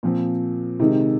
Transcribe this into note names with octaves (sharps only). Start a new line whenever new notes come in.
A#2 F3 C4
C3 D#3 G#3 D#4